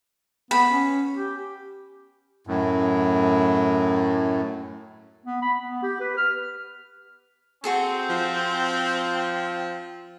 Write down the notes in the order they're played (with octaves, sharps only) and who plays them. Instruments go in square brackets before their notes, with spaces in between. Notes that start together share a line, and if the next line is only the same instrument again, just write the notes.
[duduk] B3 [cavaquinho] B5
[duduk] C#4
G4
[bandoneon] F#2 A2
[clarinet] B3
B5
B3
G4
B4
F6
[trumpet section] C4 [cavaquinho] F#4 G#4 A4
[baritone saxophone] F3